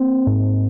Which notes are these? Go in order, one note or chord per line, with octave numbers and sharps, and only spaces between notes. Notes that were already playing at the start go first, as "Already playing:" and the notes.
Already playing: A#3 C4
G#2